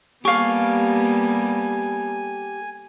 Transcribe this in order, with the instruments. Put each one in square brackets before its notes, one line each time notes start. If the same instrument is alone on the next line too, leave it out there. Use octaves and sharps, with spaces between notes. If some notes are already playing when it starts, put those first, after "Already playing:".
[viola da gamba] G3 A#3 B3 [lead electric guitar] G4 A4 [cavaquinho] F5 C#6 [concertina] G#5